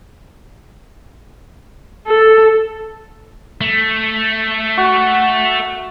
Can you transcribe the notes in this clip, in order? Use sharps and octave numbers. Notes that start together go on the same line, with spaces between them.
A4
A3
F#4